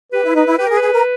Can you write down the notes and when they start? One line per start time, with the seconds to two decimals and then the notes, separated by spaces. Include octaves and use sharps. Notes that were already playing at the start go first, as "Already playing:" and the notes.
0.12 G4 B4
0.24 E4
0.35 D#4 B4
0.46 E4
0.58 G4 B4
0.67 G#4 A#4
0.77 G#4 B4
0.93 A#4